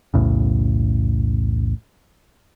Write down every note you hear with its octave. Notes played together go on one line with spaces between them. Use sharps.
B1 E2 A2 C#3